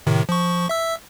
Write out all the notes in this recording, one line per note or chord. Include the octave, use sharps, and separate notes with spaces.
A2 C3 D#3
F3 C#6
E5 E6